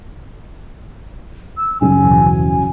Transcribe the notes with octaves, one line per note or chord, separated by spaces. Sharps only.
E6
F#2 C#3 F#3 G#5
D#2 B2 E3